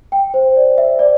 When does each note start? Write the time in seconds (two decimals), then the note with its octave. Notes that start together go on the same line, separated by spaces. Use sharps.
0.12 G5
0.34 C5
0.56 D5
0.78 E5
0.99 D5